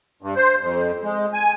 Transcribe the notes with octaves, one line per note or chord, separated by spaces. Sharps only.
G2
C5
F2
G#3
G#5